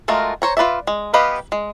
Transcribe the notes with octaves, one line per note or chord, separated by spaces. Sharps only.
G#3 A3 F4 F#4 A#4
C5 C#5 A#5
F4 B4 D5 E5
G#3
B3 G4 B4 D#5 F5
G#3